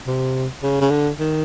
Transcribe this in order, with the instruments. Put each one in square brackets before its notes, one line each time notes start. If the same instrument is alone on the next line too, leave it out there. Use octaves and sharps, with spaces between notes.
[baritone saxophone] C3
C#3
C#3
D3
D#3